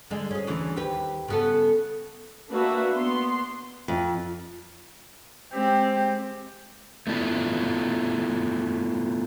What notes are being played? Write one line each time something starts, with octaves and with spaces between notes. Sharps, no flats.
D3 G#3
C#4 G#4
D2 C#3 E3
D#2 G4 B4
C#3 B3 A4
A#3 D4 F#4 B4 E5
B3 C6
F2
G#3 C4 G4
A3 B3 D4 E4 F4